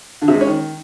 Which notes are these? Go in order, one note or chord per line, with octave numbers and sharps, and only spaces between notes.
D3
C3
G#3
C#4
D#3